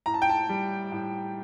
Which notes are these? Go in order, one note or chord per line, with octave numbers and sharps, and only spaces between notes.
A2 A#5
A5
G5
A5
G3
A2